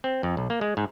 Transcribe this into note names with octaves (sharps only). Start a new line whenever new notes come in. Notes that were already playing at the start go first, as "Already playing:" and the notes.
C4
F2
B1
A#3
G#3
G#2